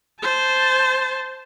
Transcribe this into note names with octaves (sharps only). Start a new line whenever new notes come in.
C5 A5